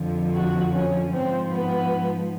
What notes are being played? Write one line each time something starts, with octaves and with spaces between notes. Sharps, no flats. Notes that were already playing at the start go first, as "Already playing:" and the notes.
Already playing: F2 D3 F3
F#4
C#4
G#2 F3 C4
B3